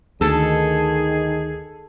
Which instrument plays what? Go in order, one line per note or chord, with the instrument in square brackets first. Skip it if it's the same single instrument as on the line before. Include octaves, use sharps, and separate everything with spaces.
[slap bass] D2 [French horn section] D#3 [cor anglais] G#4 [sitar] A4